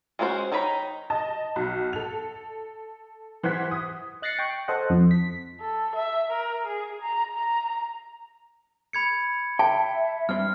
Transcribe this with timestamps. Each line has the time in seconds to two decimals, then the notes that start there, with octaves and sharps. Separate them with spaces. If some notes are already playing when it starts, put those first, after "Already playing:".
0.19 G#3 C#4 F#4 A4 C5
0.52 D#3 D#4 C#5 A#5 B5
1.10 D#5 A5
1.56 B1
1.93 A4 F7
3.43 E3 C5 F#5 F#6 G#6 B6
3.71 D#6
4.22 D#5 F#6 A6 A#6 C7 C#7
4.39 G5 C#6
4.68 A4 C5 D#5 F#5
4.90 F2
5.11 B6
5.61 A4
5.96 E5
6.31 A#4
6.67 G#4
7.02 A#5
7.36 A#5
8.93 B5 G#6 C#7
9.59 E5 G5 A5
10.29 G2 C4 F6